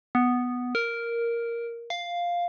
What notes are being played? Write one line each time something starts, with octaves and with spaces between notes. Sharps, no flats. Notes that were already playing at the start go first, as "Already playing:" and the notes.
B3
A#4
F5